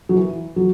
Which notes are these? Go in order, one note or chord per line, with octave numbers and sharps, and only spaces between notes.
F#3
E3
F#3